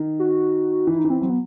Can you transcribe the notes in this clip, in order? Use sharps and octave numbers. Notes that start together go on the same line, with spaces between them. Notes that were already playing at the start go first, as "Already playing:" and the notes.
Already playing: D#3
F#4
E3 E4
D#4
E3
C4
F#3 C4
B3